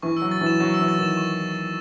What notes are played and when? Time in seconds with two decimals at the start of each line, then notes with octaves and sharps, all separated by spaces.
0.03 E3 C#6
0.17 E6
0.22 F#3
0.31 A6
0.41 E3
0.46 E7
0.60 F#3 C#6
0.74 E6
0.79 E3
0.88 A6
0.99 D#3 E7
1.17 C#6